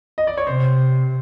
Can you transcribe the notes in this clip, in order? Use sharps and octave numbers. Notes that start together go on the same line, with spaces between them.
D#5
D5
C#5
C3 C5